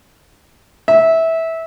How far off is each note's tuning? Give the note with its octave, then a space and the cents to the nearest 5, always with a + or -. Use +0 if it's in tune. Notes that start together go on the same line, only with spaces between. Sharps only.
E5 -15